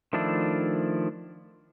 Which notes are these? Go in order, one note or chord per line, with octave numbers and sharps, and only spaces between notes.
D#3 F3 A3 D4 E4